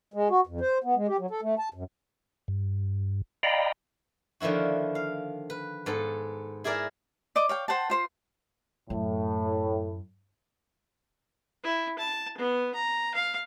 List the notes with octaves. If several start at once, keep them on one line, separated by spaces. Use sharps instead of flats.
G#3
F#4
F2
C5
B3
G#3
G4
F#3
A4
A3
A5
F#2
G2
D5 D#5 F5 G5 A#5 B5
D3 D#3 F3 E4 F#4
F5
B4
G#2 B3 A4
E4 G#4 A#4 D5 E5
D5 D#5 D6 D#6
C#5 F5 G5
C5 F#5 G5 A5
F4 C5 C6
F#2 A2
E4
A5
B3
A#5
F5